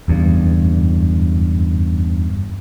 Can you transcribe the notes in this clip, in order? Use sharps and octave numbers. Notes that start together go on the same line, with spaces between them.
F#1 E2 G2